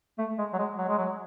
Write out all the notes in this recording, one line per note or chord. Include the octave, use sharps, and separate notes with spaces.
A3
G#3
F#3
G#3
F#3
G#3
F#3